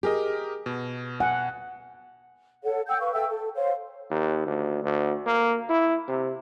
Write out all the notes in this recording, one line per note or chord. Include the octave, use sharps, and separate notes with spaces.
G4 G#4 A#4 D#5
B2
F#5 G#5
A4 C#5 F#5
F#5 G5 E6 G6
B4 F5 C#6
A4 E5 G5 E6
A4
C5 C#5 F5
D#2
D2
D2
A#3
E4
C3